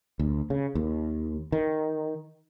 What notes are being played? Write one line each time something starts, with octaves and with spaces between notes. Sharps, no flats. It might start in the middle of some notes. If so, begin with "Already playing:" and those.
D2
C#3
D#2
D#3